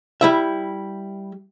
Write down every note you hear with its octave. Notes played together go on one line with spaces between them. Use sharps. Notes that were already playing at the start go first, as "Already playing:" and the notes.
G3 E4 E5